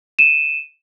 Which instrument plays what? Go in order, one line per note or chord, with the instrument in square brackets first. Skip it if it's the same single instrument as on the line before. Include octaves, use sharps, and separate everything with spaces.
[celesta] D#7 E7